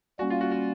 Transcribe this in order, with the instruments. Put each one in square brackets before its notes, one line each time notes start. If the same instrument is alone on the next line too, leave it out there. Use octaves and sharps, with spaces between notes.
[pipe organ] G3 A#3 C#4 [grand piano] F#4
[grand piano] F4
F#4
F#4